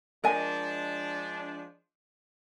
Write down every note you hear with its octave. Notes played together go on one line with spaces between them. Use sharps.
F3 G#3 D4 A#4 D#5 G#5